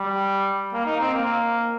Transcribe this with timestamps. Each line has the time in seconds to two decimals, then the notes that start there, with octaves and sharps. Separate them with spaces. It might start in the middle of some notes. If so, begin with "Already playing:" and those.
Already playing: G3
0.73 A#3
0.86 D#4
1.00 C4
1.13 A#3